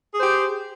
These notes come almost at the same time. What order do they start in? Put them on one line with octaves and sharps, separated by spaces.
G#4 C5 G4